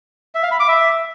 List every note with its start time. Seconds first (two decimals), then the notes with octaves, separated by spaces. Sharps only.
0.35 E5
0.43 F5
0.51 B5
0.60 D6
0.68 E5